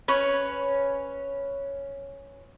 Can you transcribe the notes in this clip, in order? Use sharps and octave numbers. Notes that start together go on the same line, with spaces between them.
C#4 B4 C#5